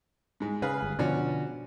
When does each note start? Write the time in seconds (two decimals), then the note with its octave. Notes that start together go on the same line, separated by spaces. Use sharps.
0.40 G#2 G#3
0.62 C#3 G#4 B4 F5
0.82 G1
0.99 B2 D3 F3 C#4 F#4 D5